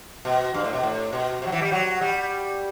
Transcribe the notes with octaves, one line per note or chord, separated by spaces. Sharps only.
B2
G2
A2
B2
A2
B2
C3
F#3
E3
G3
F#3
G3